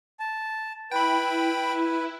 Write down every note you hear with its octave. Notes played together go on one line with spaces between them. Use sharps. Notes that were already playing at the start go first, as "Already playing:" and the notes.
A5
E4 B4 G5 B5